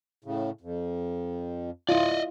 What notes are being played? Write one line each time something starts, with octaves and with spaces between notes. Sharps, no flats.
A2 C#3
F2
E4 F4 D5 D#5